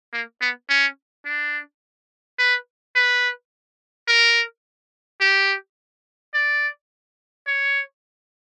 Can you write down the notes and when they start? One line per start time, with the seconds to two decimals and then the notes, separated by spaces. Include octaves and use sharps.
0.13 A#3
0.41 B3
0.69 C#4
1.25 D4
2.38 B4
2.95 B4
4.08 A#4
5.21 G4
6.34 D5
7.47 C#5